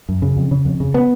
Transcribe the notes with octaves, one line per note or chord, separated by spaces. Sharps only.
F#2
C#3
F2
C#3
F2
C#3
B3